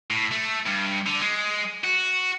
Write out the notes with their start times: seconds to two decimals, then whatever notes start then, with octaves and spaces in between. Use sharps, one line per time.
0.10 A2
0.32 A3
0.66 G2
1.07 D3
1.21 G#3
1.84 F#4